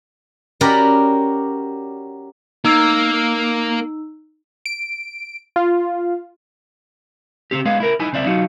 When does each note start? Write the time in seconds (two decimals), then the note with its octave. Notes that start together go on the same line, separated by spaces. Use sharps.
0.61 C#4 F#4 G4 A#4 D5 B5
2.65 A#3 D#4 E6
4.66 D7
5.56 F4
7.51 C#3 C4 G4
7.65 G#3 B3 F5
7.80 E4 A#4
8.00 D#4 E4 G#5
8.13 C#2 C4 D5 E5
8.26 F#3 D#4 F4 F#4